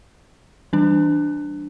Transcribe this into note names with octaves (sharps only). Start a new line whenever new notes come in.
E3 G3 D4